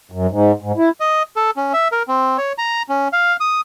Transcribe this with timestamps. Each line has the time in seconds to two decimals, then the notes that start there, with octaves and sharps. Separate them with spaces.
0.12 F#2
0.31 G#2
0.63 G#2
0.77 E4
1.00 D#5
1.36 A4
1.57 C#4
1.73 E5
1.92 A#4
2.08 C4
2.38 C#5
2.58 A#5
2.89 C#4
3.13 F5
3.40 D#6